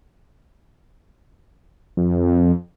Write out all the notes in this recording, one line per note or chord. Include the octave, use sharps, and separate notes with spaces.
F2